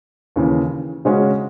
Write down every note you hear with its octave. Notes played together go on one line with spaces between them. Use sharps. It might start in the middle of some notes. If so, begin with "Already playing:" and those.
D#2 C#3 E3
C#3 G#3 C#4 F#4